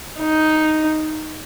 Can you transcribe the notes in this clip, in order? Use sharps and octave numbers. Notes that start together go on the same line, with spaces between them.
D#4